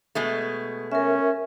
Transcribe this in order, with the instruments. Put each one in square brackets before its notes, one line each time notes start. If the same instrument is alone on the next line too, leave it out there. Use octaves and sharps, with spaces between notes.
[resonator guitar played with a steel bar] B2 G#3 A3
[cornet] C#4 [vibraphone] A#4 E5